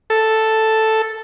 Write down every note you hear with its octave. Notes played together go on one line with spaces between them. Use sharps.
A4